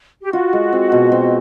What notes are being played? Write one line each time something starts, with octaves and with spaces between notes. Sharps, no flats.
G4
F4 F#4
G#3
C4
B2
C4